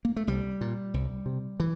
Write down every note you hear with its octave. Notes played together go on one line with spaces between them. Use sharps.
A#3
A3
C2 G3
A#2
C2
C3
E3